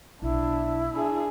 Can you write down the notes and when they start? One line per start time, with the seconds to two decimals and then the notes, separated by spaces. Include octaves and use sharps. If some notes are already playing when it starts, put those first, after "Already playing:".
0.22 B1 D4 E4
0.93 D4 G#4